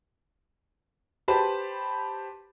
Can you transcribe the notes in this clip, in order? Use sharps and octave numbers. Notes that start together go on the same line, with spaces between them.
G4 B4 C5 A5 B5